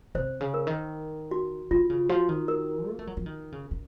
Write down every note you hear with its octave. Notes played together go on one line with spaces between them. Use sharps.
C3 C5
C#3
A#4
D#3
F#4
D#3 F4
C#3
F3 F#4
D#3
A#4
A#3
A3
F#3
F3
D#3
C#3
C#3